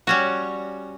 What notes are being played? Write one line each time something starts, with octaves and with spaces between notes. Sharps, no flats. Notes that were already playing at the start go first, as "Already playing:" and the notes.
G3 C#4 F#4